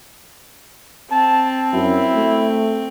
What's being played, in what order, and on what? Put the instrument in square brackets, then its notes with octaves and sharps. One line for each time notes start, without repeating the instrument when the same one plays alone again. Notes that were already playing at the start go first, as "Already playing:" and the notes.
[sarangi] C4 [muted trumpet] A5
[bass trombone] F#2 [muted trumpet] E4
[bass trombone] A3